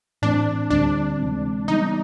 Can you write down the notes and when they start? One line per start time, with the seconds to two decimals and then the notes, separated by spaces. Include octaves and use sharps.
0.22 A2 E3 A3 C4 D4
0.70 D2 D3 G3 C4 D4
1.19 C3 E3 G#3 C4
1.68 C#3 E3 G3 B3 D#4